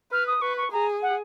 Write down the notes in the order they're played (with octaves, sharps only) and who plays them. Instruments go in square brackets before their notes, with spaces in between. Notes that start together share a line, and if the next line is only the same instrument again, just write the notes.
[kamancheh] B4 [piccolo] F6
[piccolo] D#6
[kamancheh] B4 [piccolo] C#6
[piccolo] C#6
[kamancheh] G#4 [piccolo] A#5
[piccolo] F#5